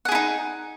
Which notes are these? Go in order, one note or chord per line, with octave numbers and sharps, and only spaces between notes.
D#4 E4 G#4 F#5